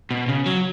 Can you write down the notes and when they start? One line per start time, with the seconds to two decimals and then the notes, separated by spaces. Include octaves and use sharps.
0.11 B2
0.28 C#3
0.46 F#3